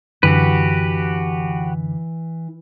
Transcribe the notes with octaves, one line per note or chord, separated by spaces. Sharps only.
F#2 D3 E3 F#4 G4 B4